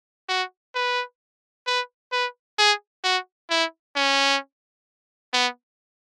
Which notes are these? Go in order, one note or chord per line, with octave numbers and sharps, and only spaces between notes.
F#4
B4
B4
B4
G#4
F#4
E4
C#4
B3